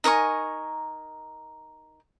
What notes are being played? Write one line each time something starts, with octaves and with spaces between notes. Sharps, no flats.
D#4 A#4 G#5 C#6